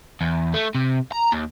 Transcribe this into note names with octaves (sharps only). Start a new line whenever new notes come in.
E2
A3
C3
A#5
D#2